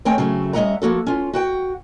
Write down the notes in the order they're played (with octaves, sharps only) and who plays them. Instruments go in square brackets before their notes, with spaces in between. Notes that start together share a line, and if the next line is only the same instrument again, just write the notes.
[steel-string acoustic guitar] D#2 A3 C4 C#5 G5 G#5
C#3 F#3 A3 C4
G3 C#4 D#5 E5 F#5 A#5
F3 A#3 F#4 A4
C#4 F4
F#4 F#5 G5